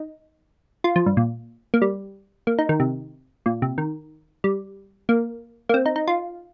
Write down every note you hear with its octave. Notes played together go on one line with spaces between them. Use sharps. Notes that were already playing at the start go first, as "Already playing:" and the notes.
Already playing: D#4
F4
F3
G2
A#2
A#3
G3
A#3
D#4
D#3
C3
A#2
C3
D#3
G3
A#3
A#3
C4
D#4
D#4
F4